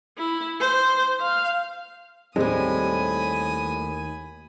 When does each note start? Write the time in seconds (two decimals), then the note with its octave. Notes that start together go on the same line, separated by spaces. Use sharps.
0.18 E4
0.60 C5
1.21 F5
2.36 D#2 A2 G3 G#3 C4 G#5 B5 D#6